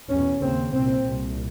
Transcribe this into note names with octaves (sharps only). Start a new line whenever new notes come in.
E2 B2 C#4
D#2 C#3 C4
C2 A#2 C4
C2 A#2